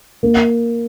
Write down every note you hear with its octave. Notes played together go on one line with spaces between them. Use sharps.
A#3